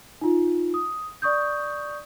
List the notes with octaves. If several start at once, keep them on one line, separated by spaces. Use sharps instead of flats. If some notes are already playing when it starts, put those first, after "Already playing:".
D#4 F4
D#6
D5 C#6 D#6 G6